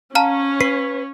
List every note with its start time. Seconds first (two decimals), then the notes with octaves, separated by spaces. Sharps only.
0.15 C#4 C#5 F5 A5 A#5 F6
0.61 B4 C7